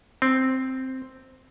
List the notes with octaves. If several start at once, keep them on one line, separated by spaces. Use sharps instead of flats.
C4